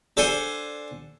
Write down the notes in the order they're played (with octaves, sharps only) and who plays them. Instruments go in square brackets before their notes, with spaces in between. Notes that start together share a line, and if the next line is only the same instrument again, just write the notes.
[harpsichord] D4 A4 C5 F#5 G#5